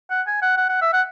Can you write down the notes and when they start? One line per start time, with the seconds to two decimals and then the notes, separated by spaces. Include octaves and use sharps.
0.11 F#5
0.27 G#5
0.42 F#5
0.57 F#5
0.69 F#5
0.81 E5
0.93 F#5